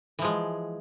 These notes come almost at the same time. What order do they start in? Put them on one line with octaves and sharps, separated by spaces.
E3 F3 G#3